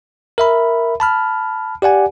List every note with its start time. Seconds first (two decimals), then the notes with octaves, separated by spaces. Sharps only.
0.38 A#4 E5 B5
1.00 A5 B5 F6
1.82 G4 D5 F#5 G#5